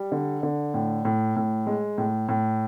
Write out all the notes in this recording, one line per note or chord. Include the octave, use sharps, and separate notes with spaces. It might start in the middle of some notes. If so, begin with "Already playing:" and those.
Already playing: G3
D3
D3
A2
A2
A2
G#3
A2
A2